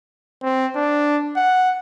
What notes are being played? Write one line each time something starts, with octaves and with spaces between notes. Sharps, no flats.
C4
D4
F#5